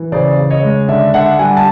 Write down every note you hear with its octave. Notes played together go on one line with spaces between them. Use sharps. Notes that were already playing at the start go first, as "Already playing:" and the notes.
Already playing: E3
C#3 C5 D5
C#3
C#5 D#5
G#3
D3 D5 E5
D3 E5 F#5
G3 F#5 G#5
A5